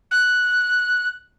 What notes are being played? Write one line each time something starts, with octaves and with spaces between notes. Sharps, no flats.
F#6